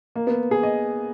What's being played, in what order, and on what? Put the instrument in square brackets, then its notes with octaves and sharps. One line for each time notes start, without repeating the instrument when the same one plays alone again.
[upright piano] A#3
B3
G#4
D#5